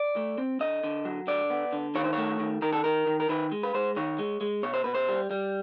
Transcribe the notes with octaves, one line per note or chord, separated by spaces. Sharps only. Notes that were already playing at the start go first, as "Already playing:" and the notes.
Already playing: D5
A3
C4
D3 D#5
D3
F#3
D3 D5
B3
D3
D#3 C#5
C5
A3 C#5
D#3
D#3 A#4
A4
D#3 A#4
D#3
A#4
D#3 B4
G#3
B4
G#3 C5
D#3 C#5
G#3
G#3
B2 C#5
C5
B2 B4
C5
G3
G3